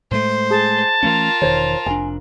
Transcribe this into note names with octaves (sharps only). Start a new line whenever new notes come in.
A2 G#3 A3 C5
G#4 A5
E3 A3 C#4 F4 A#4
E1 D#3 C5 C#5
F1 D4 G#5